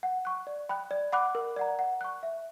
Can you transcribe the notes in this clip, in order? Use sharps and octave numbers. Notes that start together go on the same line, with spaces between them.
F#5
C#6 F#6
D5
G5 B5 F#6
D5
F#5 B5 D6 F#6
A#4
D5 F#5 A#5
F#5
C#6 F#6
E5